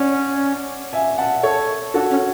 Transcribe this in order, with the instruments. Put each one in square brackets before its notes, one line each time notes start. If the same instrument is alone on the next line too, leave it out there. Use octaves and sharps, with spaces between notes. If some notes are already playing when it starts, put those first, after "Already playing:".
Already playing: [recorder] C#4 [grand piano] D5 F#5
[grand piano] E5 G#5
F#5 A5
A4 C#5
[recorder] D4 [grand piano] F#4 A4
[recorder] C#4